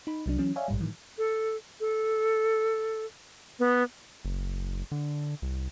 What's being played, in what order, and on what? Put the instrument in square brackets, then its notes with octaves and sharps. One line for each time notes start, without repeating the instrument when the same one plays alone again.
[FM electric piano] D#4 B5
C2 F#3 D4
E3 F#3 C#4
C#5 D5 E5 F5 G#5
A#1 G#2 G3
A2 D#3 E3 F#3
[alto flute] A4
A4
B3
[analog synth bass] F#1
D3
C2